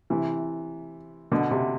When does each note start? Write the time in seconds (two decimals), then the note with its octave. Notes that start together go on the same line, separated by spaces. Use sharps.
0.10 C3 E3
1.32 B2 D3
1.51 C3